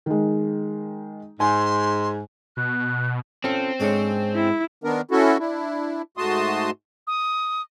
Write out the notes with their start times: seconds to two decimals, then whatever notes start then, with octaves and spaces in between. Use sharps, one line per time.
0.06 D#3 G#3
1.40 G#2 G#5 C6
2.57 B2 F#6
3.44 C4 C#4 F4 A4
3.80 G#2 G#3 C#4 D4 A4 C#5
4.35 E4
4.84 D#3 B3 D4 A#4
5.11 C#4 E4 F#4 A4
5.39 D4 E4
6.17 G#2 A3 F#4 A5 C6 D#6
7.07 D#6